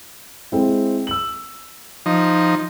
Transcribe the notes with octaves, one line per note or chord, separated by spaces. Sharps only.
G#3 C4 E4
E6 F#7
F3 D#4